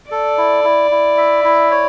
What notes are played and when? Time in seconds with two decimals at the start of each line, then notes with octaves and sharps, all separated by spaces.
0.11 A4 D5
0.38 E4
0.64 E4
0.91 E4
1.18 E5
1.44 E4
1.71 C#5